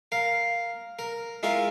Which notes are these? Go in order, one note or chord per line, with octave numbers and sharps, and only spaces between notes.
A#4 F5
A#4
G#3 E4 F4 A#4